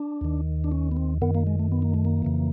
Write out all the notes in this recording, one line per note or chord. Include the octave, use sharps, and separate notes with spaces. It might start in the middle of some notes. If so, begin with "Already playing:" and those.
Already playing: D4
D#2 D#3
D4
C#4
B3
C4
F#2 D#3 B3
A#3
G#3
A3
B3
A#3
A3
A#3
F2 C#3 E3